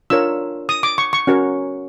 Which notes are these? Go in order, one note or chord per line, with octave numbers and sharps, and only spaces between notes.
D4 F4 A#4 C#5 E6
D#6
D6
C#6
C#6
C#4 F#4 A#4 C#5